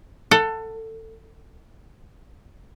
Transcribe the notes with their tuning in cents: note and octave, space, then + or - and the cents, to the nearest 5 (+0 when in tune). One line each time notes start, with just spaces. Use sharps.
A4 +20 F#5 +0